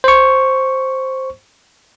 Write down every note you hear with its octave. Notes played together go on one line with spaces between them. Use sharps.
C5 C#6